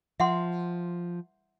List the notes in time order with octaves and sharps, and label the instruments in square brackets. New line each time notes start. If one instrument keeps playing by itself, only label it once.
[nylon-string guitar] F3 [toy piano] E5 F#5 C6